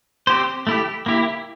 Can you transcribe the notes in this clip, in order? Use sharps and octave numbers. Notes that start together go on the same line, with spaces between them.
C4 G4 C5
A3 E4 G4
A#3 E4 G4